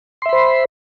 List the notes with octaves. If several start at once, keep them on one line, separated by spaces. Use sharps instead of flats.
C5 E5 B5 C6